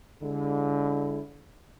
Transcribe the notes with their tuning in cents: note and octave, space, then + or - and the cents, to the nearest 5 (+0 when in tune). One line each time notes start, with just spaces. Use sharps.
D3 -35 G#3 -30 E4 +0